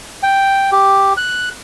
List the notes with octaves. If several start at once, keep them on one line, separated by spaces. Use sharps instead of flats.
G5
G4
F#6